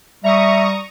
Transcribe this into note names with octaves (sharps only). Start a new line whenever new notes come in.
G3 E5 A#5 C#6 D#6